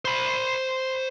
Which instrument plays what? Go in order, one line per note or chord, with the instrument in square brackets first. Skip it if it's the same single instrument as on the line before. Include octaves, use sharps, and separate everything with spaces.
[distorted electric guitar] C5 B5